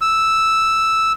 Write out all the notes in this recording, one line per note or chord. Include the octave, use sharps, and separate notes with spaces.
E6